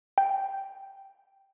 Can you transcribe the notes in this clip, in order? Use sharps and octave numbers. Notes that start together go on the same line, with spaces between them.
G5